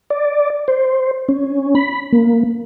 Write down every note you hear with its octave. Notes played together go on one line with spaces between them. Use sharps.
D5
C5
C#4
B5
A#3